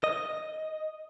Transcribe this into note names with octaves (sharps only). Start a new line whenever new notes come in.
D#5